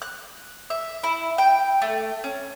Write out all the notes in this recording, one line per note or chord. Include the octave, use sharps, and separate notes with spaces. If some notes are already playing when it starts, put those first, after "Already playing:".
F#6
E5
E4
G5
A3
C#4